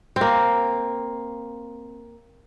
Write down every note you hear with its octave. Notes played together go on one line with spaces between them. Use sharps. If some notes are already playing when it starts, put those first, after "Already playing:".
C4
A#3